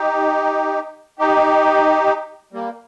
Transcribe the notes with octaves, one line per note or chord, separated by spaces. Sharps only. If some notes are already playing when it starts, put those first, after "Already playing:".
Already playing: D#4 G4
D#4 G4
G3 A#3